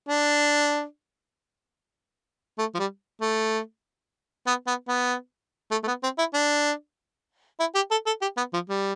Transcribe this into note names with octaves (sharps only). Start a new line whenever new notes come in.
D4
A3
F3
G3
A3
B3
B3
B3
A3
A3
B3
C4
E4
D4
E4
G4
A4
A4
G4
B3
F3
G3